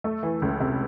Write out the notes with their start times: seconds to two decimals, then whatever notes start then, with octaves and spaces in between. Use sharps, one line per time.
0.04 A3
0.23 E3
0.42 C#2
0.60 C3